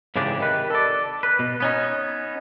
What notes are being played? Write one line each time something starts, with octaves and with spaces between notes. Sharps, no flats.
G#2 C#3 E3 D4 G4
C3 D#3 B4
A4 D5
B4
B2
B3 C#4 D#4